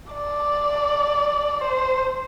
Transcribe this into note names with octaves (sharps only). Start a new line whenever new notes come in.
D5
C5